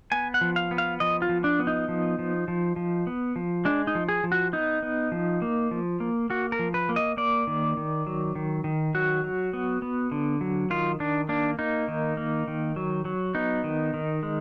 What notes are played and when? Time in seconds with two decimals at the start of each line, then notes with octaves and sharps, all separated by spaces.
0.12 B3 G#5
0.34 F#5
0.41 F3
0.56 F5
0.71 B3
0.78 F5
1.00 F3 D#5
1.22 F4
1.29 F3
1.44 D4
1.59 B3
1.67 D#4
1.89 F3
2.19 F3
2.48 F3
2.76 F3
3.07 B3
3.36 F3
3.65 G#3 D4
3.87 D#4
3.95 F3
4.08 G#4
4.24 F3
4.32 F#4
4.53 B3 D#4
4.82 B3
5.12 F3
5.42 A#3
5.71 F3
6.00 A#3
6.30 A#3 F#4
6.52 A#4
6.59 F3
6.74 B4
6.89 A#3
6.96 D#5
7.17 A#3 D5
7.47 D#3
7.77 D#3
8.07 F#3
8.35 D#3
8.64 D#3
8.95 F#3 F#4
9.24 F#3
9.53 B3
9.82 B3
10.12 D3
10.41 F#3
10.70 D#3 F4
11.00 D#3 D4
11.29 A#3 D4
11.59 A#3 D#4
11.88 D#3
12.17 A#3
12.48 D#3
12.76 F#3
13.05 F#3
13.35 B3 D#4
13.64 D#3
13.94 D#3
14.23 G#3